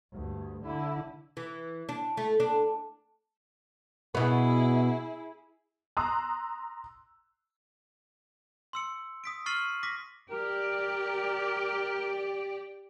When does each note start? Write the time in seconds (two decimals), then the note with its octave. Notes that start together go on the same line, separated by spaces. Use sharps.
0.13 D2 G2
0.63 D3 E4
1.37 E3
1.89 D4
2.17 A3
2.40 D4
4.15 B2 B3 E4 G#4
5.97 A#5 C6 D#6 E6 F#6
8.73 C6 E6 C#7
9.24 D#6 B6 D7
9.46 C#6 F6 A6 C7 D#7 F#7
9.83 D6 A#6 B6
10.31 G4 A#4 D5